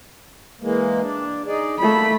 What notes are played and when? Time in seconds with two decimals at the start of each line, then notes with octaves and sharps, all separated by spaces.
0.62 E3 G#3 A#3
1.01 D4
1.46 D#4 G#4 D5
1.79 A3 A#3 B5